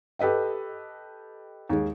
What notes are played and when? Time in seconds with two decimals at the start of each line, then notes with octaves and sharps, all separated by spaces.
0.19 G4 A4 B4 D#5 G5
1.69 D#2 G#3